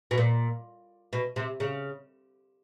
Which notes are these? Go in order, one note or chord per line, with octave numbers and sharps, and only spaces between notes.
B2
A#2
B2
C3
C#3